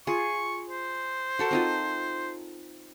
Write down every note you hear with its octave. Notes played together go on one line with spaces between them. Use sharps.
F4 G#4 C#6
C5
F#4 A4 A#4
C4 D#4 F4